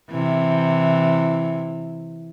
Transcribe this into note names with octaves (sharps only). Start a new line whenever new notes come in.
C3 E3